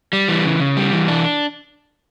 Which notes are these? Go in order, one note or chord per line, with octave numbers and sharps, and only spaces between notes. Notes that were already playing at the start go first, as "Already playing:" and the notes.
G3
E3
C#3
C#3
G3
E3
D4